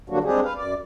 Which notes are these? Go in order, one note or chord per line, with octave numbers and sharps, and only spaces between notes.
D3 F#3 G3 A#3 D4 F#4
G3 G#3 C4 D4 G4 G#4
B4 F5
F#2 D5